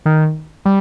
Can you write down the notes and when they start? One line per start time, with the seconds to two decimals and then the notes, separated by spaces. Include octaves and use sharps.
0.05 D#3
0.65 G3